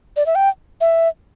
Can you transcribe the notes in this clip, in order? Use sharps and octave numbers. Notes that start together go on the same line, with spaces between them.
D5
E5
G5
E5